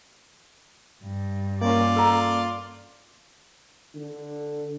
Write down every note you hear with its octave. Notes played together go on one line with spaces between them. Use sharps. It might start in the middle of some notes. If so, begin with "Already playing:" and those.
G2
A#3 C#4 F4 D5
A4 A#5
D3